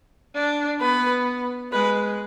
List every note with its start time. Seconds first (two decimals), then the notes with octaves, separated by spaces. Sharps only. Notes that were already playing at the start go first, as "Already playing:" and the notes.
0.35 D4
0.80 B3 B4
1.72 G#3 B4